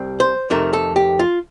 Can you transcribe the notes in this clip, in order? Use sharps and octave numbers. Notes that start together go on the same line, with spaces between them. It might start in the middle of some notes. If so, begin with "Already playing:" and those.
Already playing: C2 G3 C4
C5
F2 C3 D#3 A3 A#4
A4
G4
F4